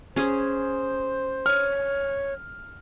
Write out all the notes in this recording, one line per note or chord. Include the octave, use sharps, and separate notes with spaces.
C#4 G#4 C5
C#5 F6